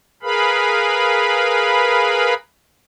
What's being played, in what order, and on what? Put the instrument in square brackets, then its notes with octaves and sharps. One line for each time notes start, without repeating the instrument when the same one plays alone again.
[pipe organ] G#4 A#4 B4 F5 B5